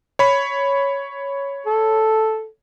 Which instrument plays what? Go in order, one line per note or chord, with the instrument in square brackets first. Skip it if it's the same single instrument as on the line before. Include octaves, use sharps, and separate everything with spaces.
[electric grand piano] C#5 B5
[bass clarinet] A4